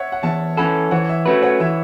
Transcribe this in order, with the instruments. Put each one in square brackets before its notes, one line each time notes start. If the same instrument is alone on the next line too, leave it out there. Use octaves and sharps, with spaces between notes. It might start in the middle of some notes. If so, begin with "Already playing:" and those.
Already playing: [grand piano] C#5 E5 F#5
F#5
[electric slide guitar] E2 [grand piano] E5 A5
[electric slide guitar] E3 C#4 A4 [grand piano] F#5 B5
[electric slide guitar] E3 [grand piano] C#5 F#5
[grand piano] E5
[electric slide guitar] A3 C#4 F#4 B4 [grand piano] E5
[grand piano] C#5 F#5
[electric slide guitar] E3 [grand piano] E5